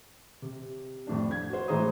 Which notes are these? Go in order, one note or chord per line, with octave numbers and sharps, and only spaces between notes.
C3
F2 A2 D4
G#6
F#4 C5
A2 E3 G#3 C5 A#5 D#6